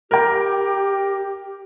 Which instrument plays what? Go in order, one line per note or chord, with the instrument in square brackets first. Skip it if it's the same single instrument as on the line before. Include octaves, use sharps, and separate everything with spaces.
[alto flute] G4 [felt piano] A#4 G5